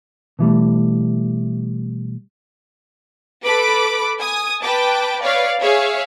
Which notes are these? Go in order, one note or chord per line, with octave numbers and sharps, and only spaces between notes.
B2 E3 G3 A3
A4 B4 B5 D6
G#5 D#6
B4 G5 A5 D6
B4 C#5 D5 F5
G#4 C#5 E5 F5